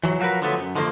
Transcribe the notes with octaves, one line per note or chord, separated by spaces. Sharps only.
E3 F#3
F3 F#3 F#4 G#4 A#4 B4
D3 F3 F#3 A3 B3
F#2
D3 D#3 F3 G#3 A#3